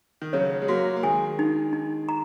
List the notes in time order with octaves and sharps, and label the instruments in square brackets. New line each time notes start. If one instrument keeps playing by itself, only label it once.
[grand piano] D#3
[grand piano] C#3 F#3 [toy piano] C#5
[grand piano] G#3
[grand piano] F#3 A#3 [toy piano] F#4
[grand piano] A#3
[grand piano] D#3 G#3 [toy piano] G#5
[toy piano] D#4
D#4
A#5